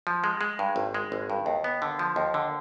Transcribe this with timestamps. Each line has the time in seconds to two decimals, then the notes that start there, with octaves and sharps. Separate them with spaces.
0.07 F3
0.24 G#3
0.41 G#3
0.59 G2
0.76 G#1
0.94 G#3
1.12 G#1
1.30 G2
1.46 D#2
1.64 B3
1.82 D3
1.99 F3
2.16 D#2
2.34 D3